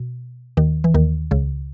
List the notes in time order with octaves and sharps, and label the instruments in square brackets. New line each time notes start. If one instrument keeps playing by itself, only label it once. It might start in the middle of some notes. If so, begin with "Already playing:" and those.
Already playing: [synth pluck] B2
D#2 D#3
E3
D#2 D#3
C#2 C#3